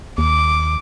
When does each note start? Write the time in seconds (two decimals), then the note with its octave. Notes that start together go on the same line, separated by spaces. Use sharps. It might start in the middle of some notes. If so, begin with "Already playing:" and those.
0.18 D#2 D6